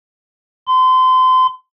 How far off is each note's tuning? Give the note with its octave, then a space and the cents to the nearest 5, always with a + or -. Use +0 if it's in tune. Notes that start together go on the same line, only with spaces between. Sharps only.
C6 -30